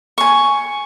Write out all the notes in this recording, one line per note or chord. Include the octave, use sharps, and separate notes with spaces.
G#5 C#6